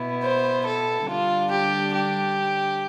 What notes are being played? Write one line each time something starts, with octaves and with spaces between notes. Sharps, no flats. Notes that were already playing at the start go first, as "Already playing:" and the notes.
Already playing: B2 B3 E4
C5
A4
D3 G3 D4 F4
G4
G4